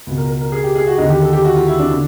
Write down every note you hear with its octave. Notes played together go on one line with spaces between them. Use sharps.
C#2 B2
A#4
A#4
A#4
G#4
G4
G#4
F#4
D#2 D3 D#4
G4
A4
G4
F#4
F4
E4
D4
D3